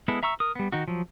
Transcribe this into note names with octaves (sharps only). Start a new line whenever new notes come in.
G#3 B3 E4 A4
E5 A#5 C#6 E6
A#4 D#6
G3 B3
D#3 D#4 F#4
F3 F#3